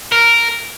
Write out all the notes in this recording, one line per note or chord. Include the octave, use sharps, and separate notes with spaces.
A#4